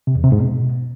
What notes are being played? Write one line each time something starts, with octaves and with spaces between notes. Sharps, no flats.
C3
E2
C3
G#2
B2